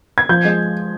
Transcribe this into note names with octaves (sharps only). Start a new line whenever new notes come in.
G#6
F3 G6
G#3